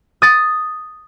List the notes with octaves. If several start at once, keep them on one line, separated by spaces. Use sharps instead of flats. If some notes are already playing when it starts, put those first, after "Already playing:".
D#6 A6